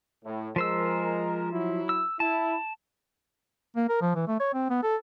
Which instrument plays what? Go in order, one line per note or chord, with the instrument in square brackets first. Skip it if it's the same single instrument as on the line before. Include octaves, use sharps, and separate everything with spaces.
[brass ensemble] A2
[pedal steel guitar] F3 C5 E6 [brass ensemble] G#3 A#4
[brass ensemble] F#3 E4
[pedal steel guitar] E6
[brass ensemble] E4 [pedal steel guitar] A5
[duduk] A#3
A#4
F3
E3
A3
C#5
C4
B3
A4